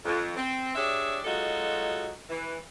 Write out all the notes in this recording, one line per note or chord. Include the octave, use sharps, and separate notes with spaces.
F2
C4
D4 G4 G#4 C#5 D5 E5
F#3 G#3 D#4 F4 F#4 A4
E3